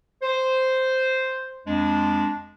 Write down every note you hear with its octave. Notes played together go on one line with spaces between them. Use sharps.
C5
F2 G#3 D4